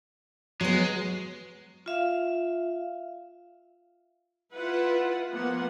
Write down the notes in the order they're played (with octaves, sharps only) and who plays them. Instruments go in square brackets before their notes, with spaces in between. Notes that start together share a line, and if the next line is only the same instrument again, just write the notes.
[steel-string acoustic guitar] F#3 B3 [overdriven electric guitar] G#3
[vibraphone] F4 E5 F5
[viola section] E4 F4 B4 F#5
F3 A#3 B3 F#5